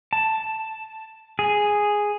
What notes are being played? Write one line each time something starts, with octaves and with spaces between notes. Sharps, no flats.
A5
G#4